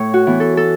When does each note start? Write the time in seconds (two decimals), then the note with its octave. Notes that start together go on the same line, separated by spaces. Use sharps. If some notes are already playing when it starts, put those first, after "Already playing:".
Already playing: A2 C#5
0.14 F#4
0.27 E3 B3
0.40 A4
0.57 A4